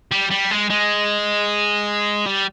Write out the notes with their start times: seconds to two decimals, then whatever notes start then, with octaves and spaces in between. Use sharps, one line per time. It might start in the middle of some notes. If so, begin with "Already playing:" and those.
0.12 G3
0.31 G3
0.51 G#3
0.70 G#3
2.26 G3